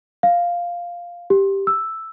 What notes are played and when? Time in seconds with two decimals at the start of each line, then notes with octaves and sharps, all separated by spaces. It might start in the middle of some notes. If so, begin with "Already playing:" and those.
0.23 F5
1.30 G4
1.67 E6